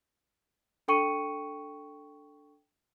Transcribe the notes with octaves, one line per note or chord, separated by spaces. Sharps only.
D4 A4 G5 C#6 C#7 D#7